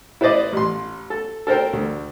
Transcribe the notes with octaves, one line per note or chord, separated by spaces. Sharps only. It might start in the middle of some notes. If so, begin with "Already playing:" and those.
E4 B4 C5 D5 D#5
A1 C6
A4
A4 A#4 C5 G5
D2